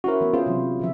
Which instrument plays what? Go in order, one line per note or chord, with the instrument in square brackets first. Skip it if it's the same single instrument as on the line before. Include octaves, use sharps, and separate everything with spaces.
[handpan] C#4 E4 C5 [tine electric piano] F#4 A#4
[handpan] E3 B3
[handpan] C#4 G#4 C5 [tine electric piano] F4
[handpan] C3 E3 F#3
D3 F3 E5